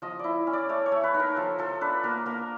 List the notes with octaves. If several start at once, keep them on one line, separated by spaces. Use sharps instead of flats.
F3 D#5
E4 D5
C#4
D5
A3 C#5
C#5
A3
B4
D#4
A#4
F3 A4
F3 A4
D4 B4
A#3 A#4
A#3 A#4